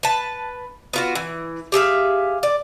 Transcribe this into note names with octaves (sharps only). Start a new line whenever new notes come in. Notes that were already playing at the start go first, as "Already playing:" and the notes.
B4 A5
B3 F4 F#4
E3
G4 G#4 E5 F5
D5